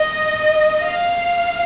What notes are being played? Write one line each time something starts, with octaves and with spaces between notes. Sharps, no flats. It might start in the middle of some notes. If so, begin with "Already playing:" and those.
Already playing: D#5
F5